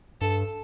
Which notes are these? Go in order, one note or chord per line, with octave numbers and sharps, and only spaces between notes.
G2 A4